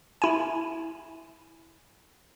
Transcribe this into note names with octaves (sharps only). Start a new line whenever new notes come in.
E4 G#5